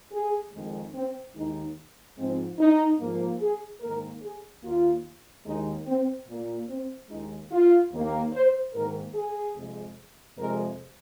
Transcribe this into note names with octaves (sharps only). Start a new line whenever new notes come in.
G#4
F2 D#3 G#3
C4
D#2 D#3 G#3 D#4
G#2 F3 G#3 C4
D#4
G#2 F3 A#3
G#4
G#2 D#3 A#3 A#4
G#4
D#2 D#3 A#3 F4
D#2 D#3 G#3 D#4
C4
A#2 A#3
C4
D#2 D#3 G#3 D#4
F4
D#2 D#3 A#3
C5
G#2 D#3 A#3 A#4
G#4
F2 C3 G#3
F2 C3 G#3 A#4